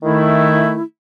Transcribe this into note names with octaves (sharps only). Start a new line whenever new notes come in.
D#3 A3 E4